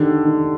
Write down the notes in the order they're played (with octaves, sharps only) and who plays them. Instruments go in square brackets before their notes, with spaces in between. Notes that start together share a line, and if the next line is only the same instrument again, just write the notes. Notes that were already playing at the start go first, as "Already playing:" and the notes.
Already playing: [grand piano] D3 [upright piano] D#3 G4
[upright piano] D#3